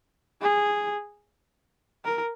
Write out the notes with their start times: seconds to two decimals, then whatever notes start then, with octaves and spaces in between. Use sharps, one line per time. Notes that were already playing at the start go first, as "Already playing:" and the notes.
0.41 G#4
2.04 A#4